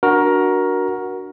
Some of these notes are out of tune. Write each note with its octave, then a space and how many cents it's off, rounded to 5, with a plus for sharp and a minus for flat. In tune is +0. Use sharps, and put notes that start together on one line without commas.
D4 +5 F#4 +0 A#4 +15